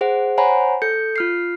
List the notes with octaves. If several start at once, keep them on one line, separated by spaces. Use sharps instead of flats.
G#4 C5 F#5
C5 C#5 F#5 G#5 A#5 B5
A4 G6 C#7
F4 F6 C7